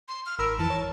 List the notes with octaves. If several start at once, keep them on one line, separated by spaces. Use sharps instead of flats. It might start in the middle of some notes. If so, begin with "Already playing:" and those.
C6
F6
G#1 A#4 B5 E6
F2 E3 A5
C#5